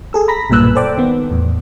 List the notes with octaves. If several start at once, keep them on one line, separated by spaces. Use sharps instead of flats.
G#4 A4 E6
A#5 B5 A#6 B6
B1 G2 A#2 B4 E6 F#6
A4 C5 D5 G5 D6
D#3 B3
E2 A2